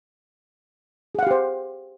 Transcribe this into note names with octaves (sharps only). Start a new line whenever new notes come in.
G4 G#4 C5 F5 F#5